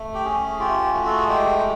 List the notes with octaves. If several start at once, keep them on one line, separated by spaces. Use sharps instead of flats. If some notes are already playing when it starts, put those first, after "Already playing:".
Already playing: A3
G4
C#4 G#4
F4 G4
A3 F#4
A4
G#4
G#3 G4
G4